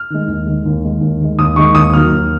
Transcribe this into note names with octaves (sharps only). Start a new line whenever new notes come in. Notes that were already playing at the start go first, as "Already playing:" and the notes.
Already playing: F6
D#3 G#3
D#2
D#3 G#3
D#2
D#3 G#3
D#2
D#3 G#3
D#2 D#6
D#3 G#3 C#6
D#2 D#6
D#3 F#3 A#3 F6
D#2